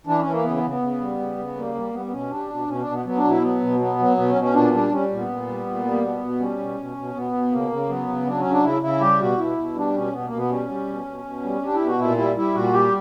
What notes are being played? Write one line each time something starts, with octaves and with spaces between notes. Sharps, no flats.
E3 D4
C#4
E3
A#3
C#3 B3
B3
C#3
B3
C#3
G3
C#3
C#3
G3 A#3
G3
G3 B3
B3
B2 C#4
G3 D4
B2
B2 C#4
D4
B2
B3
F#3 B3
D4
B2
E4
F#3 B3
B2
F#3 B3
F#3
B2 B3
C#4
B2
C#4
A#2 D4
G3 D4
G3 C#4
A#2
B3
A#2
G3
A#2
G3
A#3
B2 B3
B2
G3 C#4
B2
B2
B2
B2 B3
B2
C#3 A#3
C#3
F#3 B3
C#3
F#3 D4
C#4
C#3
D4
C#3 E4
C#3 E4
G3 G4
B2 F#4
B2 E4
B2
G3 D4
B2 C#4
B2 B3
A#3
B2
B3
G3 C#4
G3
B2
B2
B2
G3
G3 D4
E4
B2
F#4
A#2 E4
G3 E4
G3 E4
A#2 F#4
G3 G4